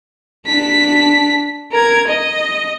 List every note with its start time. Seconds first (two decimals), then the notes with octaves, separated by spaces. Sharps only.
0.46 D4 B6
1.72 A#4 G#6
2.07 D#5